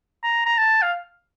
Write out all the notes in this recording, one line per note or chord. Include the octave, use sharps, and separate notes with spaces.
A#5
A#5
A5
F5